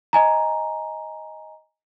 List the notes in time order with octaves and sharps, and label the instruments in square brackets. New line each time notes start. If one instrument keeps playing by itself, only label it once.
[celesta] D#5 G#5 A#5